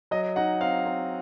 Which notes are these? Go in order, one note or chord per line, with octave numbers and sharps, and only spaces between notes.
F#3 D#5
D#4 F#5
C4 F5
C4